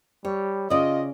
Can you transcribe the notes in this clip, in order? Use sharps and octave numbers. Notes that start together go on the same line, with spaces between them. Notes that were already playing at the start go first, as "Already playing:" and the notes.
G3 C#5
C#3 F4 D5 D#5